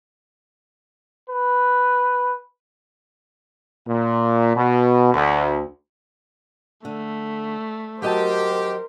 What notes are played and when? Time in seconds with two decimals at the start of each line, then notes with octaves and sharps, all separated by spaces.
1.30 B4
3.87 A#2
4.55 B2
5.13 D2
6.85 D3 A3
8.02 F#3 G4 A#4 C5 D#5 A5